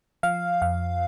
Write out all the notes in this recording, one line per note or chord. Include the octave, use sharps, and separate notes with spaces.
F3 F5
F2 F5